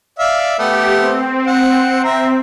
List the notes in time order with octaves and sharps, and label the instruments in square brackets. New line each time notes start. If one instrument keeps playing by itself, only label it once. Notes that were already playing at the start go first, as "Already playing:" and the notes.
[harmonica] D5 E5 F5
[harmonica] A3 B3 [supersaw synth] G4
[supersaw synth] C4
[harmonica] F#5
E5 A#5